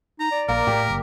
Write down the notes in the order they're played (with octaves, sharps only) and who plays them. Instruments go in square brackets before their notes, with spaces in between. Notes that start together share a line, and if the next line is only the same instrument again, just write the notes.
[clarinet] D#4 [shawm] A#5
[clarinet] D5
[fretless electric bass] A#1 [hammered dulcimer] A#3 [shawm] A#4
[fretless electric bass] A2 G#3 A#3 [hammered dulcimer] G4
[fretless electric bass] F#1